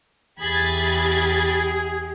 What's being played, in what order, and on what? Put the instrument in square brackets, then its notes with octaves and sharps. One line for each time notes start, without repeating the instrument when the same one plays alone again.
[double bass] E2 [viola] G4 [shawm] G#4 [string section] B5 G#6 A6